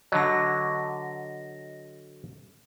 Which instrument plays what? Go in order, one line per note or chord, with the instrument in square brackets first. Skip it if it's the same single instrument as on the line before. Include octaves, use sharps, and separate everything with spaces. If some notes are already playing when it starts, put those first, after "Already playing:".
[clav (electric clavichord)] D3 F#3 [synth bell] D#5 A#6